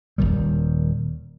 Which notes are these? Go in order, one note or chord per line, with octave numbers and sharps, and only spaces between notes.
D#1 D#2 D#3 G3